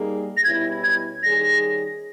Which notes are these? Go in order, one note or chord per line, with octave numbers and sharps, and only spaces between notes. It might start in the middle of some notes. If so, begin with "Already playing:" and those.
Already playing: G3 A#3 D#4 G#4
A#6
B2 G3 C#4 E4 G#6
G#6
D#3 G3 C#4 G#4 A#6